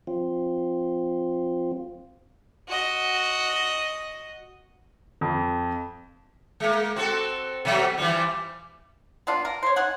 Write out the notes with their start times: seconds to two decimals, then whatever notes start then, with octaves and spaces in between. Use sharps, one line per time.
0.07 F3 C4 F4
2.68 F#4 D#5
5.21 F2
6.60 G#3 A#3
6.96 C4 F#4 A4
7.65 B2 F#3 G3
7.98 E3 F3 G3
9.27 A#3 B3 D4 F4
9.45 A#4
9.63 C5 C#5
9.76 C#4 D#4 F#5 G#5